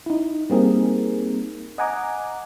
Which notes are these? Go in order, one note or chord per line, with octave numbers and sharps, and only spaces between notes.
D#4 E4
G3 A#3 C4 D#4 G#4 A#4
D#5 F#5 G#5 A#5 D6